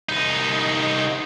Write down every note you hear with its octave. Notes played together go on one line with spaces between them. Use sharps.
C2 D#4